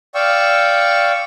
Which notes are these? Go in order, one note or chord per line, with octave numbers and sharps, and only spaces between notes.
D5 F5 G5 C#6 E6